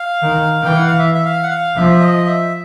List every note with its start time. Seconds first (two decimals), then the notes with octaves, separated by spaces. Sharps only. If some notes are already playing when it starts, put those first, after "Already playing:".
Already playing: F5
0.23 D#3
0.62 E3 G5
0.76 F#5
0.88 F5
0.99 E5
1.14 E5
1.25 F5
1.43 F#5
1.50 F5
1.76 F3 E5
2.01 D#5
2.26 E5